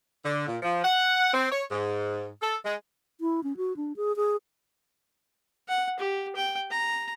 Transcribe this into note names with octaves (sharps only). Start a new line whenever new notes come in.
D3
A#2
F3
F#5
C4
C#5
G#2
A4
G#3
E4
C#4
F#4
D4
G#4
G#4
F#5
G4
G5
A#5